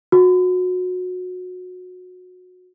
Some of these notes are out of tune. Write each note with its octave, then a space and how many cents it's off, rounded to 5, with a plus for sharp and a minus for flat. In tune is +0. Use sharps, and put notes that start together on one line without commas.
F#4 -25